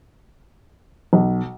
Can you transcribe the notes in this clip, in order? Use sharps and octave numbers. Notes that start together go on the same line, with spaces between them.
B1